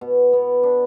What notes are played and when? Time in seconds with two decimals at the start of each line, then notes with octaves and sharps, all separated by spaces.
0.01 B2
0.33 B3
0.63 D4